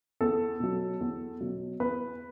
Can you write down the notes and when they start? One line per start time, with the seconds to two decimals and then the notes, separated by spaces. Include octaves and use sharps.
0.21 E2 A4
0.60 B2 F#3
1.01 E2
1.41 B2 F#3
1.80 E2 B4